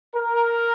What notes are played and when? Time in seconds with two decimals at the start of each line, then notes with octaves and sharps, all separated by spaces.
0.15 A#4